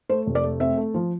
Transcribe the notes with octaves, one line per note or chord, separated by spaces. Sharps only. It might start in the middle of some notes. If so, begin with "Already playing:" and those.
A3 C5
F1
D5
A3
C4 E5
A3
F3